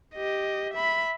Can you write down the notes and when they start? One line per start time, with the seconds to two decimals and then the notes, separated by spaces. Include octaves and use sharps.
0.15 G4 D#5
0.73 E5 B5